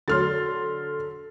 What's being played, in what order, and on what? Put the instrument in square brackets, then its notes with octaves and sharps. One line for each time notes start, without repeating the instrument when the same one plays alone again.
[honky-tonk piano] D3 F#3 [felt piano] C6 F6 A6